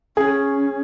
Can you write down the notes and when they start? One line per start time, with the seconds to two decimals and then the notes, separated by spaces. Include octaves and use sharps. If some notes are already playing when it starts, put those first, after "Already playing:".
0.17 C#4 G#4